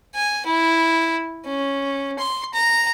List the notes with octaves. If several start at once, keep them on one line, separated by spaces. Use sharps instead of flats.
G#5
E4
C#4
C6
A#5